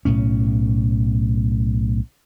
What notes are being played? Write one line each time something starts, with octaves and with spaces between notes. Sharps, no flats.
B1 A2 C#4